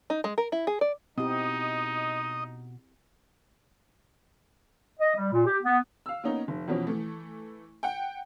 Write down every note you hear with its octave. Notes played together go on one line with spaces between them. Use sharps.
D#4
G#3
A#4
E4
G#4
D5
B2 C4 D#4 E4 G4 D#5
D#5
G3
A#2
G4
B3
F5 E6
A#3 B3 C#4 D#4
F1
E2 B2 F3 C#4
E3 A3
F#5 G5